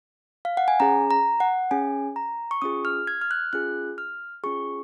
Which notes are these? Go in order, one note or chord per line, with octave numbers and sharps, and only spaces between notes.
F5
F#5
G#5
C#4 G#4 A#5
A#5
F#5
C#4 G#4 G#5
A#5
C#6
C#4 F4 G#4 D#6
F6
G#6
F6
F#6
C#4 F4 G#4 F#6
F6
C#4 F4 G#4 C#6